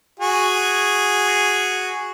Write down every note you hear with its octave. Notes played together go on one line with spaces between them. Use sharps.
F#4 G#4